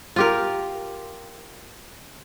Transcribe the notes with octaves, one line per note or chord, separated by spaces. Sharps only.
F4 G4 A#4